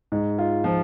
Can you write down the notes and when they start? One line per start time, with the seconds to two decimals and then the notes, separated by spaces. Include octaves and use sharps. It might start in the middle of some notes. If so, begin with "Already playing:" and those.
0.12 G#2
0.39 F4
0.64 F3